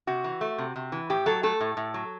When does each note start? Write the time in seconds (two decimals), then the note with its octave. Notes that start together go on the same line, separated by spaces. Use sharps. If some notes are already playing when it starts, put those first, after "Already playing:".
0.07 C3 F#4
0.24 E3
0.41 A3
0.58 C3
0.76 C3
0.92 E3
1.10 A2 G4
1.26 F#3 A4
1.43 A3 A4
1.61 A2
1.77 A2
1.94 F#3